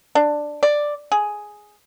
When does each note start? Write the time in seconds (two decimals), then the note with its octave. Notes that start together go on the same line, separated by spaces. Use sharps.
0.15 D4
0.63 D5
1.12 G#4